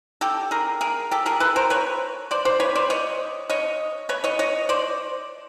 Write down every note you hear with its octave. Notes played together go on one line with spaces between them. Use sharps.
G4 A4
G#4 A#4
G#4 A#4
G4 A4
G#4 A#4
A4 B4
A#4 C5
B4 C#5
C5 D5
C5 D5
B4 C#5
C5 D5
C#5 D#5
C#5 D#5
B4 C#5
C#5 D#5
C#5 D#5
C5 D5